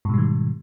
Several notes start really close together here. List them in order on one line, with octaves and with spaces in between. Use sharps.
G#2 B2 G3 D#3